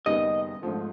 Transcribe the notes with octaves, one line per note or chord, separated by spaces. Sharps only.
F#1 F#2 D#3 G3 B3 D#5
G#1 G#2 F3 A3